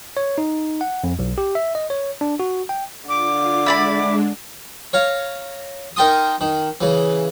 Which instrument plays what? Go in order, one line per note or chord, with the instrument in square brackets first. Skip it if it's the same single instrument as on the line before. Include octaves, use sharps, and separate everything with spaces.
[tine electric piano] C#5
D#4
F#5
F2
B1
G4
E5
D#5
C#5
D4
F#4
G5
[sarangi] D3 [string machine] F4 [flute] D6
[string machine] G#3 D4 [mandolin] E4 D5 B5
[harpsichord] C#5 F5 A#5
D#4 A#4 G5 A5 C6 D#6
D#3
C#3 E3